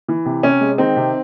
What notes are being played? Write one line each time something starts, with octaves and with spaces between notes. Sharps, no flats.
E3
C3
C3 C#4
G#3
D#3 C4 D#4
C3